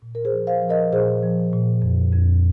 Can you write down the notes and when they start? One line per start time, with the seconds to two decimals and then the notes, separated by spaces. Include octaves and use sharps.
0.02 A#2
0.15 A#4
0.25 G#4 C5
0.32 F3
0.47 C5 F5
0.62 F3
0.69 A#4 D#5
0.92 A#2 G#4 C5
1.23 F3
1.53 A#2
1.82 F2
2.12 F2